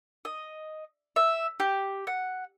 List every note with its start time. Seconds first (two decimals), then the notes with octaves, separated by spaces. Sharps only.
0.25 D#5
1.16 E5
1.60 G4
2.07 F#5